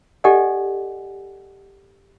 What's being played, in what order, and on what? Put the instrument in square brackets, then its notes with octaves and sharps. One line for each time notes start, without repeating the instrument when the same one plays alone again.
[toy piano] G4 A4 D5 D#5 F#5 G#5